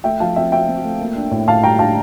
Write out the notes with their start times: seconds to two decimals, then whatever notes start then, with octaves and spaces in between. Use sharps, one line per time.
0.04 A3 E5 G5
0.20 F3 F5 A5
0.36 C4 E5 G5
0.52 C4 E5 G5
0.68 C4
0.84 A3
1.00 A#3
1.16 D4
1.31 A2
1.48 A2 F5 A5
1.63 G3 G5 A#5
1.79 D4 F5 A5